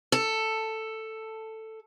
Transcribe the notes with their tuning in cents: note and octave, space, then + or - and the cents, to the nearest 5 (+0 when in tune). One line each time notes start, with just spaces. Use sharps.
A4 +5